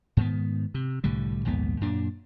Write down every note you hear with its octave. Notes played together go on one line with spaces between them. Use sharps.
G#2 D#3 B3
C3
C2 A2 D3 G3
A#1 D#2 G#2 B3
F#2 A#2 D4